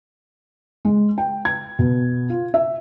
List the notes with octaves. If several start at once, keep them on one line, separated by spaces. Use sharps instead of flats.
G#3
G5
G#6
B2
F4
E5